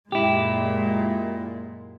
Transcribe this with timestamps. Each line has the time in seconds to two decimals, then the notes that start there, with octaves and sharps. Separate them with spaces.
0.12 F#2 A#2 G#3 E4 G4